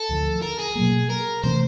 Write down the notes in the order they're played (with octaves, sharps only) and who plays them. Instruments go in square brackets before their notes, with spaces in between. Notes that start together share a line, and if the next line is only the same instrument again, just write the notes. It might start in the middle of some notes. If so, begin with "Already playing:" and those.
Already playing: [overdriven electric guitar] A4
[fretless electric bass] D2 D3 F3
[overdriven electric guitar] A#4
G#4
[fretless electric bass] B2 F#3 A#3
[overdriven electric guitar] A#4
[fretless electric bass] C3 E3 A3 C#4 [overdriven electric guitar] C5